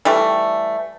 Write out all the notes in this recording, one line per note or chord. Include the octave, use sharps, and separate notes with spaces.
E3 G3 A3